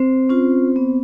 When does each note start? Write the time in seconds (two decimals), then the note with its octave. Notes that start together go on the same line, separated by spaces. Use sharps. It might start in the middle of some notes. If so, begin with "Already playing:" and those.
Already playing: C4 C5
0.29 C#4 F4
0.76 B3